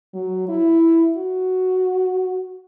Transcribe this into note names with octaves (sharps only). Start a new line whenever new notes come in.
F#3
E4
F#4